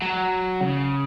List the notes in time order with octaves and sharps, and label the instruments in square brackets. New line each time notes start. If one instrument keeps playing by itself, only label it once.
[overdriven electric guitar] F#3
C#3